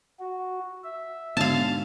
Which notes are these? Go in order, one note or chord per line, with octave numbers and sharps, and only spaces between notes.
F#4
E5
G#2 B2 D3 B3 F5 A5